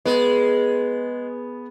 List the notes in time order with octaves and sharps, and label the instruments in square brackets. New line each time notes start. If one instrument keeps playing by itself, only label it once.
[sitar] G#3 [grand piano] B3